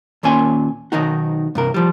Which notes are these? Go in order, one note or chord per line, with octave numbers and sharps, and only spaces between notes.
D#2 A#2 C#4 G#5 C6
B1 D#3 D#4 F#4
G2 C3 A#4
F3 G3